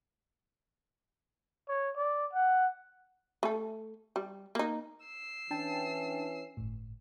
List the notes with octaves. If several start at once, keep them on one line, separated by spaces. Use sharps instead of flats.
C#5
D5
F#5
A3 A4
G3
A#3 D#4
E6 C7
E3 C#4 D4 G5 A5
G1 A2